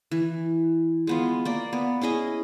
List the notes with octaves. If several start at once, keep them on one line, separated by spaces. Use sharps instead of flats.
E3
G#3 B3 F4
A#3 D5
B3
C#4 E4 G#4 D#5